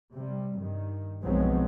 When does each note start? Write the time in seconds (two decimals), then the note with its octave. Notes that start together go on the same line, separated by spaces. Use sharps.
0.14 C3 G3
0.58 G2 D#3
1.23 B1 F3 F#3 G#3 B3 C4